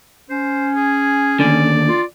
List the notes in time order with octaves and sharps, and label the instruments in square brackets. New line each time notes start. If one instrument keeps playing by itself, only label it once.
[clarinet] C#4 [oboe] C5
[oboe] G#4
[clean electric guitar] D#2 D3 [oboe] D5
[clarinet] F4